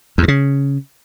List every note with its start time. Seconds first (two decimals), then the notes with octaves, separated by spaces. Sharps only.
0.18 E2
0.23 G2
0.28 C#3